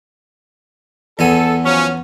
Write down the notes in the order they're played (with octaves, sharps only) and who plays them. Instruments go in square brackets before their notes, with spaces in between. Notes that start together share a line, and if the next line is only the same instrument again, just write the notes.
[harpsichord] E2 B3 G#5 [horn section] A4
[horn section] F3 F#3 C#4